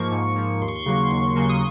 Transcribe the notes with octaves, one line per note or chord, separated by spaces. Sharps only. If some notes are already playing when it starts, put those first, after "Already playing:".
Already playing: G#2 F3 A#3 C#6
G#2
F3 A#3
D#2 C6
C#6
C6
C#6
C#3 F#3 A#3 C6
D#2 C#6
C#3 F#3 A#3
D#6